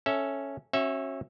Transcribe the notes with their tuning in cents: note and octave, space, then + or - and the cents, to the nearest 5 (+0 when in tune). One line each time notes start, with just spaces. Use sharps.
C#4 +0 A4 +0 E5 +0
C#4 -30 F#4 +0 E5 +0